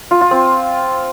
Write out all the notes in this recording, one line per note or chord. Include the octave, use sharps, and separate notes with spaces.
F4
F4
C4